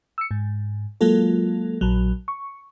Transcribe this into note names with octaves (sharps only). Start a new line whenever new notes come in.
E6 C#7
G#2
F#3 G#3 A#3 F4 A4
A#1 F#3
C#6